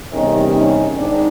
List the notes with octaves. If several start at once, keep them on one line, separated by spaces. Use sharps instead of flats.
E2 C3 D#3 G3 A#3 C#4 D#4
C#4 D#4
G#2 D#3 C4 D4